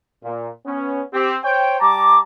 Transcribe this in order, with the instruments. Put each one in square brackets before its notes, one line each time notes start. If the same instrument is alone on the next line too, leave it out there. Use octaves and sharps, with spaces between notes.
[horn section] A#2
B3 C#4
C4 G4
C5 C#5 G5
[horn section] G3 A5 A#5 [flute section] D6